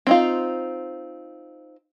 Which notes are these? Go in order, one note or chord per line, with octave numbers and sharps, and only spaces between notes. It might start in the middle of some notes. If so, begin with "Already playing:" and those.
C4 D#4 F4